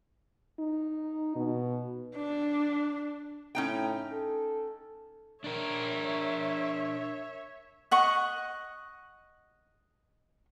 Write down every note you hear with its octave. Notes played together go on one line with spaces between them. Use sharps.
D#4
B2
D4
A2 C#4 D#4 G5
A4
D4 A#4 C#5 E5
D#5 F#5 C#6